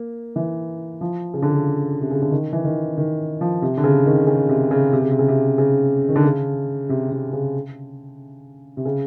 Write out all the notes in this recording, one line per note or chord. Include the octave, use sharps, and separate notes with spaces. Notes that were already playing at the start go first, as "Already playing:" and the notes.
Already playing: A#3
E3
F3
C#3
D3
C#3
C3
C#3
D3
D#3
E3
D#3
D#3
F3
C3
D3
C#3
D#3
C#3
C3
C#3
C3
C#3
C3
C#3
C3
C#3
D#3
D3
C#3
C3
C3
C#3
C3
C#3